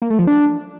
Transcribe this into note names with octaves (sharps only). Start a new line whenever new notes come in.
A#3
A3
F3
D4